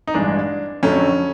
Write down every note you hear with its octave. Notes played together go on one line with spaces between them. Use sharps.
D#4
A1 G2 E3 G#3 D4
F2 D3 F#3 A3 C#4